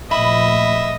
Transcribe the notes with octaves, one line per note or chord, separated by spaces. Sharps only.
A#2 F3 A3 D#5 E5 B5